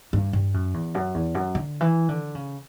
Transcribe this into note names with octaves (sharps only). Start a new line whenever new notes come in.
G2
G2
F#2
E2
F#2
E2
F#2
D3
E3
D3
C#3